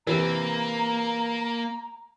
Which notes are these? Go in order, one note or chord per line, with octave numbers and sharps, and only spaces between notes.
C3 E3 A#3 A#5